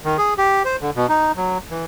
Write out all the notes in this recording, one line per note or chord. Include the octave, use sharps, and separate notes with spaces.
D#3
G#4
G4
C5
D3
B2
D#4
F#3
E3